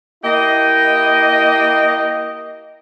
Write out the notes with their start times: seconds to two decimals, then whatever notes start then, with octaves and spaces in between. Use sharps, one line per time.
0.24 A#3 E4 G4 D#5